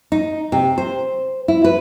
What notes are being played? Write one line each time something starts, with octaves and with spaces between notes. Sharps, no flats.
D#4
C3
C5
E4
B4